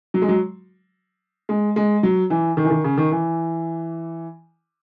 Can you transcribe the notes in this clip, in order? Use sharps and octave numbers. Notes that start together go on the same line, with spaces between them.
F#3
G#3
F#3
G#3
G#3
F#3
E3
D#3
E3
D#3
C#3
D#3
E3